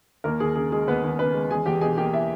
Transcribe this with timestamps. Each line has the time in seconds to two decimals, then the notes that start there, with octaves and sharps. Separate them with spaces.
0.24 D#2 A#3 A#4
0.40 D#2 G#4
0.56 C#3 G#4
0.72 G#3 G#4
0.88 D#2 B3 B4
1.04 D#2
1.19 C#3 B3 B4
1.34 G#3
1.51 E2 G#4 G#5
1.66 E2 G4 G5
1.81 B2 G#4 G#5
1.97 A#3 G4 G5
2.13 E4 E5